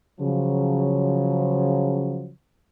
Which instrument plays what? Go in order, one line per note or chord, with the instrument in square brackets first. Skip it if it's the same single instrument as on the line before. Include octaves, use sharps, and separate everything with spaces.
[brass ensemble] C#3 F3 F#3